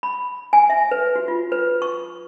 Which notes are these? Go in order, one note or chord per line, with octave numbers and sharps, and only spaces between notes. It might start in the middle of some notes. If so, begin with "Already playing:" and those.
B5
G#5
E5
B4
F#4
F4
B4
C#6